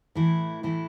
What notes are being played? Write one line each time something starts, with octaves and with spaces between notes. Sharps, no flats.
A2 E3 A3 E4
A2 E3 A3 E4